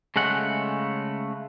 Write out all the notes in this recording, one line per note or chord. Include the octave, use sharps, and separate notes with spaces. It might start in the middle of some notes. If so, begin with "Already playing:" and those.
C#3 G#3 A3 F#5